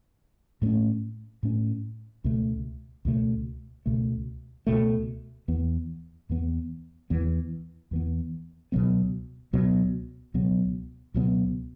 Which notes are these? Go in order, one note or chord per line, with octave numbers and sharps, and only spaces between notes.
A2 A3 C#4
A2 A3 C#4
C#2 B2 A3
C#2 B2 A3
C#2 B2 A3
C#2 B2 A3
E2 E3 B3
E2 E3 B3
E2 E3 B3
E2 E3 B3
C#2 B2 F#3 B3
C#2 B2 F#3 B3
C#2 B2 F#3 B3
C#2 B2 F#3 B3